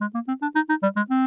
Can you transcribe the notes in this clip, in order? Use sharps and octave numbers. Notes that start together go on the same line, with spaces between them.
G#3
A#3
C4
D4
D#4
D#4
G3
G#3
C4